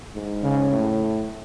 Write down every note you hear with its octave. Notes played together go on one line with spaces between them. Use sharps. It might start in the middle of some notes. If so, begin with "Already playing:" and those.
G#2
C#3
A2